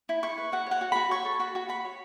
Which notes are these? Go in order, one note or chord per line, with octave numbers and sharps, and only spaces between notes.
E4
E4 C#6
B4
F#4 F#5
C#5 F#5
F#4
F#4 B5
C#5 C#6
A4
F#4 B5
F#4
F#4 B5
C#5